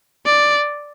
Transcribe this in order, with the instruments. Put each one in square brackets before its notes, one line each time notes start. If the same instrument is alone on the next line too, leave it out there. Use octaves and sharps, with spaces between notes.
[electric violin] D5